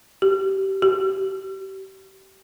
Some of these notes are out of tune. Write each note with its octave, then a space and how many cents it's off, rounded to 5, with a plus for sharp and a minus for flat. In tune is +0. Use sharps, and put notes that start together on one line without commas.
G4 -20
G4 -30